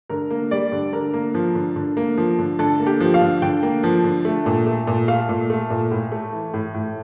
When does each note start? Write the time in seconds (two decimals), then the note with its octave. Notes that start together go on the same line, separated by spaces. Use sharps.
0.09 D3 A#4
0.30 A#3
0.51 G3 D5
0.72 D3
0.93 D3 A#4
1.14 A#3
1.34 F3
1.55 D3
1.76 D3
1.97 A#3
2.17 F3
2.39 D3
2.59 D3 A4
2.80 A#3
2.87 G4
3.00 F3
3.14 F5
3.21 D3
3.42 D3 G5
3.63 A#3
3.83 F3
4.04 D3
4.25 A3
4.46 A#2
4.66 A3
4.87 A#2
5.08 A3 F5
5.29 A#2
5.50 A3
5.70 A#2
5.91 A2
6.12 A3
6.33 E3
6.54 A2
6.74 A2